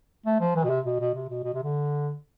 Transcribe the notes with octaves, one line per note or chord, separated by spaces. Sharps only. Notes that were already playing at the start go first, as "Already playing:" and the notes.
A3
F3
E3
B2
C3
B2
B2
C3
B2
B2
C3
D3